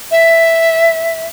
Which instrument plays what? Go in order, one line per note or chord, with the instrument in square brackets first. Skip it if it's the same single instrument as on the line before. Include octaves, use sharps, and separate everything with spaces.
[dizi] E5